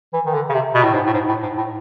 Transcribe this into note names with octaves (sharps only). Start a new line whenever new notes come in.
E3
D#3
D3
C#3
C3
B2
A2
G#2
A2
G#2
A2
G#2
A2